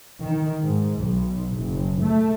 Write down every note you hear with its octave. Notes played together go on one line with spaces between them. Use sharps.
D#3
G#2
B1
F#1
A3